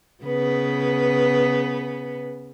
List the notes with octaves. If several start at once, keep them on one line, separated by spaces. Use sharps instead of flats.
C#3 B3 B4